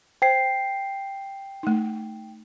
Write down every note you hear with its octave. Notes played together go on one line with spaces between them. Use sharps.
C5 G5 C7
A3 D#4